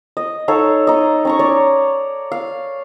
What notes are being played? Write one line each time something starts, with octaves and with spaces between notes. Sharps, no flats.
D#5
D#4 A4 C#5 F5
D#4 D#5
C#4 A#5 C#6
C#5 D5
F5